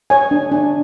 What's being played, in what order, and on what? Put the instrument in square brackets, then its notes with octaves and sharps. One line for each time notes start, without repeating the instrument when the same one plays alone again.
[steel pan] C#5 G#5
D4
D4